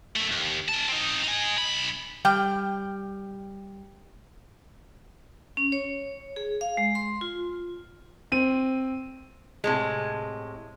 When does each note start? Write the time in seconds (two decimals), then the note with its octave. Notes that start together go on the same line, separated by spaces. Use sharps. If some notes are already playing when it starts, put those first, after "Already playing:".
0.16 F#2 A3
0.32 D#2
0.69 C#4 A5
0.88 C4 D#4
1.24 D#4 G#5
1.58 B1 B5
2.25 G3 G5
5.57 C#4
5.72 C#5
6.36 G#4
6.61 F5
6.77 G#3
6.95 C6
7.21 F4
8.32 C4 D#7
9.64 A2 C3 G#3